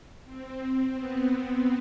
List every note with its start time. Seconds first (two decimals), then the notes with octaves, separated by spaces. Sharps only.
0.24 C4
0.94 B3